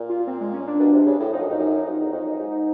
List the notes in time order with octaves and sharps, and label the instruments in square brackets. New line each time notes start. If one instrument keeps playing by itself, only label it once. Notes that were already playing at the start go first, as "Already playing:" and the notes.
Already playing: [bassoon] A#2
[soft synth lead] F4
C4
G#3
C#4
D4
[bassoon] B2
C3
C#3
A2
[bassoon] F2 [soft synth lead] D#4
[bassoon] F#2
F2
F#2
F2
E2
F2
F#2
G#2